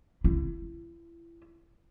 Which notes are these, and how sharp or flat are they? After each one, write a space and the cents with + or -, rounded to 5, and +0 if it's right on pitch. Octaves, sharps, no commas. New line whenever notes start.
E4 +35